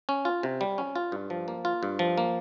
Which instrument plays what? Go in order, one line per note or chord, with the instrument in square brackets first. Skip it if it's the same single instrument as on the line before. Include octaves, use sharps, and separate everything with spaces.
[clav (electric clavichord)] C#4
F4
C3
G3
C#4
F4
G2
F3
A#3
F4
G2
F3
A#3